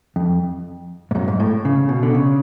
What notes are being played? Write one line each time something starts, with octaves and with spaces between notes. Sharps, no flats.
F2
G#2
F#2
G#2
A2
C#3
B2
D3
C#3